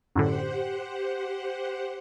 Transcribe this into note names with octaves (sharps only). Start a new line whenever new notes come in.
F#2 A2 D3 G4 C5 F#5